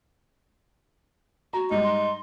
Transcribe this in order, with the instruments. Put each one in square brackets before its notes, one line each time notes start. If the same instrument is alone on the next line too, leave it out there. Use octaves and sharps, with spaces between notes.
[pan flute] F#4 [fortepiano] A#5
[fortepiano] G#2 G3 [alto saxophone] D#4
[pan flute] C6